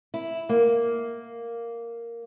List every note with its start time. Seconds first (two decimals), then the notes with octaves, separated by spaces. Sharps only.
0.14 E4
0.49 A#3